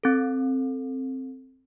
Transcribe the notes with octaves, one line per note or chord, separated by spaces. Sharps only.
C4 A4